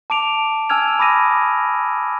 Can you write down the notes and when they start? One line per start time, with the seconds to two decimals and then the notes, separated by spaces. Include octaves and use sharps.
0.10 A5 D6 D7 F7
0.69 G#5 A5 E6 F6 G#6 F7
0.99 B5 D6 D#6 A#6 D#7